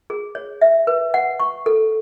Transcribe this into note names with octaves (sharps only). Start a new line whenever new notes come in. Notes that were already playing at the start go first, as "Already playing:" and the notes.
G#4
C#5
E5
B4
F#5
C#6
A4